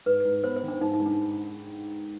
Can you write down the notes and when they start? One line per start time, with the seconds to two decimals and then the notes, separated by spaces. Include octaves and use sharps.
0.06 G#2 B4
0.25 G#2
0.43 B3 C5
0.56 C5
0.63 D#3
0.68 D4
0.81 G#2 D#4
0.93 D#4
1.00 G#2
1.06 D4